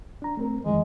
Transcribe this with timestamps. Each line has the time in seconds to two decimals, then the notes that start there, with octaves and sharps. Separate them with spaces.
0.22 D4 A#5
0.37 A3 C4 A#4
0.65 F2 D#3 E3 G#3